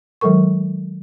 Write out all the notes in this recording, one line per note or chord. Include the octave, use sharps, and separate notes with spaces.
D#3 F#3 G#3 A4 A#4 C#6